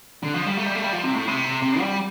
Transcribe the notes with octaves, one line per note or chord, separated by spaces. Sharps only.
D3
F3
G3
A3
G3
A3
G3
F3
C3
A2
C3
C3
G3